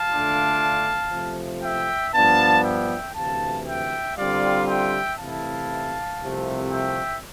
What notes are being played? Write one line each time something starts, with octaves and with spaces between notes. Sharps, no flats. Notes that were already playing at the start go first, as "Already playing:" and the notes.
Already playing: F5 A5
D3 A3 D4 F4
C3 F3 A3
E5 G5
G2 F3 B3 D4 F5 A5
E5 G5
D2 C3 E3 F5 A5
E5 G5
D3 G3 C4 F4 D5 F5
E5 G5
C3 E3 A3 E4 F5 A5
C2 C3 F3 A3
E5 G5